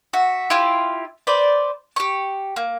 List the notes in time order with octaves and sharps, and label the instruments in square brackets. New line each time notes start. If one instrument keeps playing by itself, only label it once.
[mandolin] F#4 E5
E4 F4 G4 E5
B4 C5 D5
G4 C#6
A#3